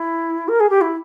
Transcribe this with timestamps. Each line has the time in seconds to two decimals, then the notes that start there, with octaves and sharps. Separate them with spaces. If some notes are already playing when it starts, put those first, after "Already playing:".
Already playing: E4
0.48 A#4
0.60 G#4
0.69 G4
0.81 E4